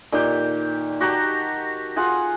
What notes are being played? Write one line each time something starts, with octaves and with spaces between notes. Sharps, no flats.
A#2 D#3 G4 G5
F#4 G4 A5 A#5
F4 G#4 F#5 G#5